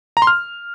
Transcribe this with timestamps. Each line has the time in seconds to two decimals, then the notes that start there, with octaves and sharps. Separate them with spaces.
0.17 A#5
0.22 C6
0.27 F6